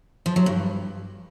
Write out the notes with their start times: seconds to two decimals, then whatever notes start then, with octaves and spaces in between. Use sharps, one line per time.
0.26 F3
0.36 F#3
0.46 G2